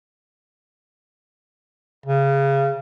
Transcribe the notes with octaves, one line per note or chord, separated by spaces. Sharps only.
C#3